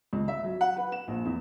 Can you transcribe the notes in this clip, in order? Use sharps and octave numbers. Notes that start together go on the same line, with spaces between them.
C#2
E5
F#3
F#5
B4
E7
A#1
E2